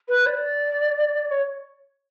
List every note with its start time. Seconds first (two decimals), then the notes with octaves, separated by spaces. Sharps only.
0.08 B4
0.26 D5
1.31 C#5